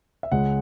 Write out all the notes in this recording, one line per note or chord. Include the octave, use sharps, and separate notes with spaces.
E5
C#2 C#3 G#3 C#4 F#5